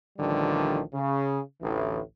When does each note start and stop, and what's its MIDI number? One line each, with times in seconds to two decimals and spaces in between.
0.19 0.80 33
0.19 0.80 50
0.19 0.80 51
0.19 0.80 53
0.19 0.80 55
0.94 1.40 49
1.61 1.99 33
1.61 1.99 38
1.61 1.99 45
1.61 1.99 52